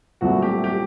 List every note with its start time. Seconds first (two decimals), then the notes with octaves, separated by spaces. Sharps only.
0.21 C2 A#2 F#3 A3 C4 F#4
0.42 G4
0.64 G4